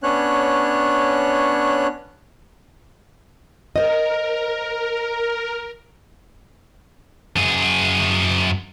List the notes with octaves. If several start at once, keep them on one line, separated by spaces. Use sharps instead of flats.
B3 C#4 D4 C#5 F#6
A#4 C5 D#5
F#2 G#4